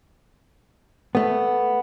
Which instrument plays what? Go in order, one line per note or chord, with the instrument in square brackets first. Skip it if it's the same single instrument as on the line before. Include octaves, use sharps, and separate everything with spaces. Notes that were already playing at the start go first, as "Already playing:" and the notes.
[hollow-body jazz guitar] A3 B3